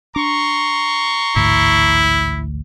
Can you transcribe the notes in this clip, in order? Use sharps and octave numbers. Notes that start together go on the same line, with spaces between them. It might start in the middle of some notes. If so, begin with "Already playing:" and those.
D4 A#5 C6 C#6
A1 D2 G#2 E4